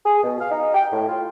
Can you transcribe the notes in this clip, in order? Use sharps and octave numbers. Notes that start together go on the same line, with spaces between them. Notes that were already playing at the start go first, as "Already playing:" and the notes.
G#4
B2
F5
D#4
G5
A2
F4